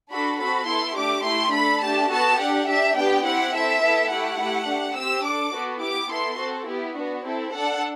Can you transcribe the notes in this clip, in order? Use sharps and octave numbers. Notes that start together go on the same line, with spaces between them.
D4 F#4 A4 B5
C4 F#4 A4 B5
B3 E4 A4 C6
A3 D4 G4 D6
A3 E4 G4 C6
D4 A4 B5
A3 D4 G4 A5
B3 F#4 A4 A5
D4 G4 F#5
D4 G4 E5
B3 D4 G4 G5
C4 E4 G4 F#5
C4 E4 A4 E5
B3 E4 A4
A3 E4 G4 F#5
A3 E4 G4
D4 G4
C4 G4 E6
D4 A4 D6
B3 F#4 A4
B3 E4 G4 D6
B3 E4 A4 C6
C4 F#4 A4
B3 E4 G4
B3 D4 F#4
C4 E4 A4
D4 A4 F#5